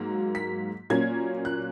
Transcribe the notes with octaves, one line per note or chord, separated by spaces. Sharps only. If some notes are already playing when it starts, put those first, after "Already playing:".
Already playing: G#2 F#3 A#3
B6
A#2 F#3 A#3 C#4 G#6
F#6